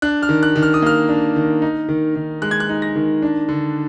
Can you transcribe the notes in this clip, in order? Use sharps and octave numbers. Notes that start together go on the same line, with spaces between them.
D4 F#6
F6
D#3
F#6
D#3
F6
D#6
A#3 F6
D4
D#3
D#4
D#3
D#3
G#3 F#6
G#6
F#6
D#4
A#6
D#3
D4
D3